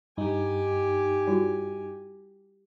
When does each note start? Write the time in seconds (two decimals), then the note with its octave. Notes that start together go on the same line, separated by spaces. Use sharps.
0.17 G2 D#4 G4 G#5
1.27 G3 E4 F#4